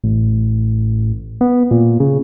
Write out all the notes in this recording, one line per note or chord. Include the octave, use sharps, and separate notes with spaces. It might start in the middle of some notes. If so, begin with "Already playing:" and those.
A1
B3
A#2
C#3